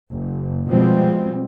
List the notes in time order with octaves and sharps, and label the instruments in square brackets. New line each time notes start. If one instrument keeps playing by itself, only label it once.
[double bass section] F#1
B2 F3 G3 G#3 C4